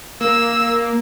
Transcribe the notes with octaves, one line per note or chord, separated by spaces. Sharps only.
A#3 E6